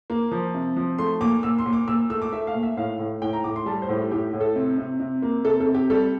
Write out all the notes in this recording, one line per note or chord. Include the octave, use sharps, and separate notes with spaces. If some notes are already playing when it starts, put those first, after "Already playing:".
A#3
F3
C3
F3
A3 C6
A#2 D6
A#2 E6
C6
A#2
D6
A#2 E6
A3 E6
D6
A3 E5
F5
A#2
E5
A2 F5
A2
A2 G5
A#5
A2 D6
C6
G3 A5
C5
A2
G4
A2 G4
A2
A4
C3
C3
C3
A#3
C3 A4
A4
C3
G4
G3 A4